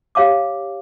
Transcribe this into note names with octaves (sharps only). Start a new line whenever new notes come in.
G4 C#5 F5 A5 D6